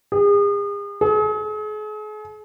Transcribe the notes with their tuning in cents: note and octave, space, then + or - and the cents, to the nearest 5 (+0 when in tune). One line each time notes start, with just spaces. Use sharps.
G#4 -40
G#4 +40